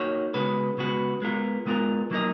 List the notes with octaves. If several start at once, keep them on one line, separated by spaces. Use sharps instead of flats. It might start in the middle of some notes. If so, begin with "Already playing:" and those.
Already playing: A#3 D#4 F#4 C#5
C#3 G#3 B3 F#4 B4
C#3 G#3 B3 F#4 B4
G#3 B3 F4 A#4
G#3 B3 F4 A#4
F#3 A#3 D#4 A#4 D#5